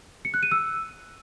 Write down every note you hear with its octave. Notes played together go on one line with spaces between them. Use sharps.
C#7
F#6
D#7
E6